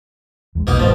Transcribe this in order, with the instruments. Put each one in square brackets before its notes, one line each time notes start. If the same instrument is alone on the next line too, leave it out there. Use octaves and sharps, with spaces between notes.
[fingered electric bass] E2 F#3 G#3
[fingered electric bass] B1 [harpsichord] B2 A#3 D#4
[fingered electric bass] G#1 [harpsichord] G2 F3